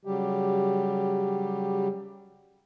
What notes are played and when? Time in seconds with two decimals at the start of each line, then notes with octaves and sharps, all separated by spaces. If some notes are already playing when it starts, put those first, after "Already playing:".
0.05 C#3 F#3 G3 G4